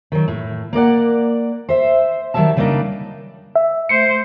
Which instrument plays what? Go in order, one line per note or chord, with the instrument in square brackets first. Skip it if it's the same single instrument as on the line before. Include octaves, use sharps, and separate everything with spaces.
[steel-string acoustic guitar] D#3 F#3
A2
A#3 A#4 D5 F#5
C5 E5
D#3 F#3 G3 E5 A5
C#3 G3 A#3 B3 D4 D#4
[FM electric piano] E5
[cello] A3 C5 [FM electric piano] C#7